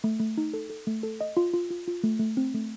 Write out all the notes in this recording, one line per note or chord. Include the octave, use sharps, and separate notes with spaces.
A3
A3
D#4
A4
A4
A3
A4
D#5
F4
F4
F4
F4
A3
A3
C4
A3